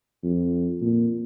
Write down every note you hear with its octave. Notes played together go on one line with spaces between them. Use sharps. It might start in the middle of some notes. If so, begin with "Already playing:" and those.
F2
A#2